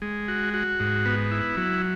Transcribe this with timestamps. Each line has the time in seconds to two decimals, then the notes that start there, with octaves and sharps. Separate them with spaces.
0.02 G#3
0.28 F#4
0.54 F#4
0.80 G#2
1.06 B3
1.31 E4
1.57 F#3